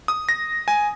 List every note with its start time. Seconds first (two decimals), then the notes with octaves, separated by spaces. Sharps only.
0.08 D#6
0.29 A#6
0.68 G#5